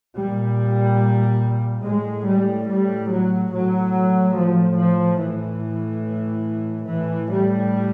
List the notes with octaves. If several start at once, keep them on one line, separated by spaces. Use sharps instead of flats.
A#2 G3
A2 G#3
G3
G3
F#3
A2 F#3
F3
F3
A2 E3
A2 E3
G3